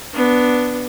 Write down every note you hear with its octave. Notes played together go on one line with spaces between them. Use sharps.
B3 D4